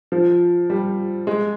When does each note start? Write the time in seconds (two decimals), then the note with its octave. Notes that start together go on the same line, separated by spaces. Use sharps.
0.12 F3
0.70 G3
1.27 G#3